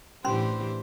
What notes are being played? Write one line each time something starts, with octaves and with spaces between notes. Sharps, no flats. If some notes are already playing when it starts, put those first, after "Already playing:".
A2 E3 C#4 D4 G4 C5 B5 C6